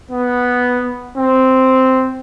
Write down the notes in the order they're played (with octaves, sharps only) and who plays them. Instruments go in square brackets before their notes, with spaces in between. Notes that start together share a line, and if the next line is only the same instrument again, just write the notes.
[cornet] B3
C4